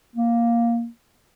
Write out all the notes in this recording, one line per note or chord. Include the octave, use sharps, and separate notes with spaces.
A#3